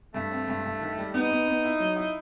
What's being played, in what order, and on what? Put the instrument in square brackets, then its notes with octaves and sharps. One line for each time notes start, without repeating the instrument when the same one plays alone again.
[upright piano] G2 [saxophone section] A3
[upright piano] C4
G2
G2
D#3
G3
[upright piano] B3 [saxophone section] D#4
[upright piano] B3
B3
E4
F#3
E4